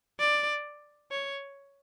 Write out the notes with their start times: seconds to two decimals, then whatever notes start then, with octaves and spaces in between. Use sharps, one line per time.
0.20 D5
1.11 C#5